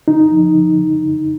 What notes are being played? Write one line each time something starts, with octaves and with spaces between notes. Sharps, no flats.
D3 D#4
F3
D3
D3
D3